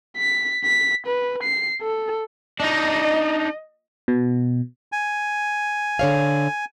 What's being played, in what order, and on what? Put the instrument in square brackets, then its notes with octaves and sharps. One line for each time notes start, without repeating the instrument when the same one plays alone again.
[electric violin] B6
B6
B4
C7
A4
[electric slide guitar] D4 D#4 [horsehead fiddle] D#5
[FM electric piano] B2
[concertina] G#5
[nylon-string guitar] D3 C#5 F5